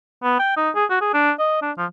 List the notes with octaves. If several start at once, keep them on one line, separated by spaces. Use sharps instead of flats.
B3
G5
D#4
G#4
F#4
G#4
D4
D#5
D4
F3